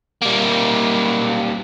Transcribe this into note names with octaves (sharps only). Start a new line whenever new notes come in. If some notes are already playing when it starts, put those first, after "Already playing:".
G3 A#3